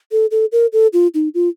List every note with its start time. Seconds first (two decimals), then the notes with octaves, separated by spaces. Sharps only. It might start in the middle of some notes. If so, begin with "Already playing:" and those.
0.12 A4
0.31 A4
0.52 A#4
0.73 A4
0.93 F4
1.14 D#4
1.34 F4